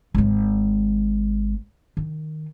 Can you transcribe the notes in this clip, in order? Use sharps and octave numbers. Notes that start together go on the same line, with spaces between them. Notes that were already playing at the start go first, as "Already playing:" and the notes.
G#1 G#3
D#3